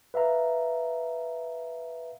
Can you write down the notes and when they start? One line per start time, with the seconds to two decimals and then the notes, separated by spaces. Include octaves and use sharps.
0.14 B4 E5 F5 A#5